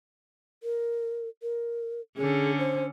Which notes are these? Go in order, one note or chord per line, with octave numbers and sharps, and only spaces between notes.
A#4
A#4
D3 C#4 G#4
C5